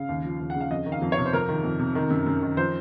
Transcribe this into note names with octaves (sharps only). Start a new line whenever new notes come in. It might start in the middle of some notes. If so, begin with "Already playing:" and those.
Already playing: C#3 F5
D#2
F3
D#2
F#5
C#3 F5
F2 D#5
D#3
F5
F2
C#5
C3
C5
F2 A#4
D#3
F2
C3
D#3
F#2
F#2
D#3
F3 C5